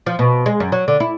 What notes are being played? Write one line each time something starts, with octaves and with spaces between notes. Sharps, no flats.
F3
B2
G#3
F#2
F#3
D3
E4